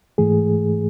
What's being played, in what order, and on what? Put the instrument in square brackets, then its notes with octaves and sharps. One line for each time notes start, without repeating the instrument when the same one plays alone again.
[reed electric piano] G#2 E3 A3 G#4